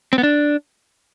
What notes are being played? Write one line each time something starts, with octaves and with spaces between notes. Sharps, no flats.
C4
B3
D4